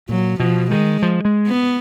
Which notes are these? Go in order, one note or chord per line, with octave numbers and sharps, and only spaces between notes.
A#2 F#3
B2 F3
D#3 G#3
F3
G#3
B3